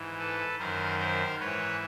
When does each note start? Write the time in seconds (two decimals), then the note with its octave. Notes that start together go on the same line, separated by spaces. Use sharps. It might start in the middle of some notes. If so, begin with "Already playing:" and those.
Already playing: G#2 E3
0.19 A4 B4
0.59 F#2 D#3 A#4 C5
0.99 A#4 C5
1.39 G#2 E3 B4 C#5